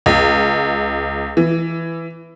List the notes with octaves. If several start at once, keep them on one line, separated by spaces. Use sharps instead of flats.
C#2
E3